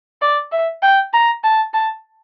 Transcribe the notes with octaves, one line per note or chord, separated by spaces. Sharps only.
D5
E5
G5
A#5
A5
A5